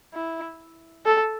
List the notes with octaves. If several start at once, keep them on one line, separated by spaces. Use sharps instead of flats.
E4
A4